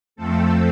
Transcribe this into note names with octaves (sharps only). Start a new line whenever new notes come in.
F2 F3 A3 C4 A4